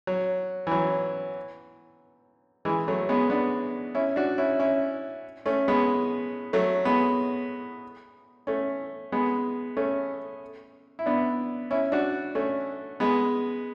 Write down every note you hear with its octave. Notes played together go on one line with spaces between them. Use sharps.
F#3
E3
F#3
E3 G#3
F#3 A3
G#3 B3
B3 D4
C#4 E4
D4 F#4
C#4 E4
C#4 E4
A3 C#4
G#3 B3
F#3 A3
G#3 B3
A3 C#4
G#3 B3
A3 C#4
E4
B3 D4
C#4 E4
D4 F#4
A3 C#4
G#3 B3